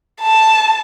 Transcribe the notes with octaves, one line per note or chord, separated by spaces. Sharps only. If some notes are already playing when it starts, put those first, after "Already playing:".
A5